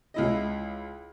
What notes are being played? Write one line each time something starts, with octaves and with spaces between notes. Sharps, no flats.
C#2 E4 D#5